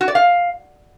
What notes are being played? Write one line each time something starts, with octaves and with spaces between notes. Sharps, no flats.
F#4
D5
F5